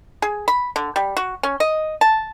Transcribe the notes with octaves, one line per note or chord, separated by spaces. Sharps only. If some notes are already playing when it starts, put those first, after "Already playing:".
G#4
B5
D3
G3
F#4
C#4
D#5
A5